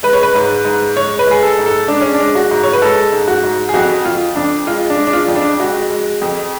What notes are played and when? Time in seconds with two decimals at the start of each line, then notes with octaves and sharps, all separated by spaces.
0.03 G#3 B4
0.13 C#5
0.23 B4
0.35 G#2
0.65 G#2
0.96 G#3 C#5
1.19 B4
1.27 G#3 G#4
1.43 A4
1.58 G#2
1.66 A4
1.88 G#3 D4
2.01 C#4
2.14 D4
2.20 G#3
2.35 F#4
2.51 G#2
2.63 C#5
2.73 B4
2.82 G#3 A4
3.12 G#2
3.28 F#4
3.43 G#2
3.69 G#4
3.74 F2 F#4
4.05 F2 F4
4.36 F2 D4
4.67 G#3 F4
4.90 D4
4.97 G#3
5.07 D4
5.13 F4
5.28 F2
5.36 D4
5.60 G#3 F#4
5.90 G#3
6.22 F2